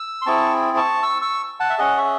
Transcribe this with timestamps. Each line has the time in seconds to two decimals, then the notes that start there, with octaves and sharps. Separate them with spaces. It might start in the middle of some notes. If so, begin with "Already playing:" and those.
Already playing: E6
0.22 C6
0.26 C4 E4 G#4 A5 C#6
0.77 A5 C#6
1.03 C#6 E6
1.22 C#6 E6
1.60 F#5 A5
1.70 E5
1.78 C#4 G#4 D#5 F#5
1.97 C#5 E5